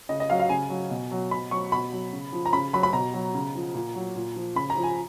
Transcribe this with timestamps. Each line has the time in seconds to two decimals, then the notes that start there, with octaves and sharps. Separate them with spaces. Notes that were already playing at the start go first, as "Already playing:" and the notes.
0.09 C#3 D#5
0.20 D#5
0.29 F#3 F5
0.40 F5
0.49 C#3 G#5
0.70 F#3
0.91 B2
1.11 F#3
1.31 B2 B5
1.51 F#3 C#6
1.72 B2 B5
1.92 F#3
2.13 C#3
2.33 F3
2.46 A#5
2.53 C#3 B5
2.73 F#3 B5
2.83 B5
2.93 B2 A#5
3.14 F#3
3.34 C#3
3.55 F3
3.75 A#2
3.95 F#3
4.16 A#2
4.36 F3
4.55 C#3 B5
4.70 A#5
4.77 F3
4.83 G#5